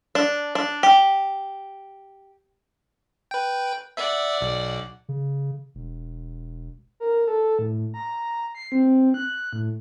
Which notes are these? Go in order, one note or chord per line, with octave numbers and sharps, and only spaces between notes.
D4
D4
G4
B4 G5
D5 E5 F#5
B1
C#3
E1
A#4
A4
A2
A#5
C7
C4
F#6
A2